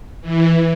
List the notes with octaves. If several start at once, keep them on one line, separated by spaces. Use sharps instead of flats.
E3